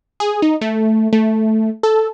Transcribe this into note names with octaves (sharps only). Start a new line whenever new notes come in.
G#4
D#4
A3
A3
A4